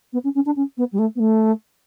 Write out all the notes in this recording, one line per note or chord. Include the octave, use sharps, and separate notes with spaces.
B3
C#4
C#4
D4
C#4
B3
G3
A3
B3
A3